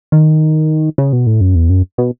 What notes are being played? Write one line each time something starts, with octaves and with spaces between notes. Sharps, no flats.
D#3
C#3
B2
A2
F#2
E2
F#2
B2